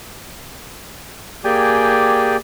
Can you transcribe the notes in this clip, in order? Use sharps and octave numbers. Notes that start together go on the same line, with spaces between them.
A#3 G4 G#4 D5 G5 G#5